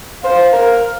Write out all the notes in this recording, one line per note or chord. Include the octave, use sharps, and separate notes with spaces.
C5 F5
A#4